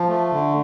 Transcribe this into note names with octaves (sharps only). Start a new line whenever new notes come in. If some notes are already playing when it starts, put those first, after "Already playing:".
Already playing: F3
A3
D3